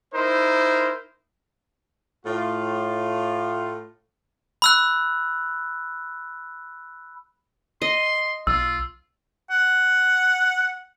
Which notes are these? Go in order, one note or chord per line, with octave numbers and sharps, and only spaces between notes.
D#4 E4 A#4 C5
A2 F4
B5 E6 F#6
D#5 C6
B1 F4 E6
F#5